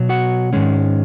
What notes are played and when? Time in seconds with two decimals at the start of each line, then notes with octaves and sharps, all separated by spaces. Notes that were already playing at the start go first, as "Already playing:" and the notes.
Already playing: B2 F#3
0.09 F#4 F#5
0.53 G#2 D#3 G#3 C#4